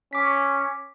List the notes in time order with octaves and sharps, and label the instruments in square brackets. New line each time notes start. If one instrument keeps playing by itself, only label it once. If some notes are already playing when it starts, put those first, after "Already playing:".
[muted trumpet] C#4 [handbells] D6 B6